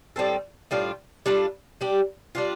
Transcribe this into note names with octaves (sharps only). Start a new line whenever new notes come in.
A2 G3 C4 A4
A2 G3 D4 F4
G3 D4 F4 A4
G3 D4 G4
G3 D4 F4